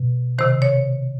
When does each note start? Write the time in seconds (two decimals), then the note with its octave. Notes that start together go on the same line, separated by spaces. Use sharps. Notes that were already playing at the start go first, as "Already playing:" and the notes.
Already playing: B2
0.38 C3 D#3 C5
0.62 C#5